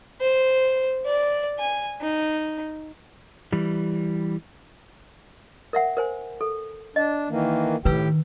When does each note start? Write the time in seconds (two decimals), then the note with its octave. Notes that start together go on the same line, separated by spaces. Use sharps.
0.21 C5
1.06 D5
1.59 G#5
2.01 D#4
3.53 E3 G3
5.73 A#4 E5 F#5
5.97 A#4 C5 G#5
6.41 A4
6.96 D4 D#5
7.30 D#3 E3 A#3
7.85 A2 D#3 G4 B4 G5 E6